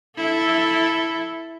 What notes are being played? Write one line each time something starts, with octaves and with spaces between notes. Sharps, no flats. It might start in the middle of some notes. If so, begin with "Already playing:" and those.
E4 A4